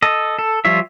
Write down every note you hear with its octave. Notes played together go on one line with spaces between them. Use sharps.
A4 D#5
A4
F3 G3 F4 C#5 E5